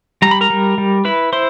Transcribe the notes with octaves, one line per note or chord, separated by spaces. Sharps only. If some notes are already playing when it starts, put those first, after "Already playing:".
G3 A#5
B5
A#4 A#5
G3
G3
E4 B4 B5
E4 C5 C6